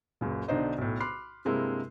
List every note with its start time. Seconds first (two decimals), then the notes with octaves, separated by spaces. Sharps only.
0.21 C#2 F#2 A#2
0.48 B1 D3 D4 D#4 C5 D#5
0.78 B1 A2
1.00 B5 C6 D6 F6 F#6 C7
1.45 G2 C3 G#3 A#3 C4 E4